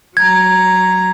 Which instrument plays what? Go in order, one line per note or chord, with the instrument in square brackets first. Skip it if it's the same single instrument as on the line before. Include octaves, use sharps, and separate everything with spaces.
[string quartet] F#3 A#5 [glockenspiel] G#6